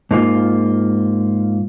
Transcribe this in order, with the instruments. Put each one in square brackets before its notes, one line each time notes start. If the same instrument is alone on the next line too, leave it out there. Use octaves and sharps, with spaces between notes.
[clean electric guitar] G#2 A#3 F4